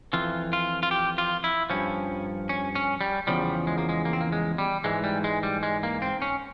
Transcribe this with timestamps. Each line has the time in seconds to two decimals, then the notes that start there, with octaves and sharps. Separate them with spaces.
0.13 F2 E3 F4
0.53 F4
0.83 F4
0.91 G4
1.18 F4
1.44 E4
1.70 G2 F3 C#4
2.49 C#4
2.75 C#4
3.01 G3
3.27 E2 C#3 F3 G3
3.67 G#3
3.78 A#3
3.89 G#3
4.05 A#3
4.13 C4
4.21 A#3
4.32 G#3
4.58 G3
4.84 G#2 E3 G#3
5.04 G3
5.24 G#3
5.43 G3
5.63 G#3
5.83 A#3
6.02 C4
6.22 C#4